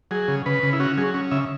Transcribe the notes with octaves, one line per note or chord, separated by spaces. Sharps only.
F#3 G#4
C#3
C#3 B4
C#3
E4
C#4 F#4
F#3 G#4
C#4
C#3 E5